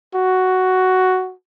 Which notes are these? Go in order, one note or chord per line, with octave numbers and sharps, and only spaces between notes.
F#4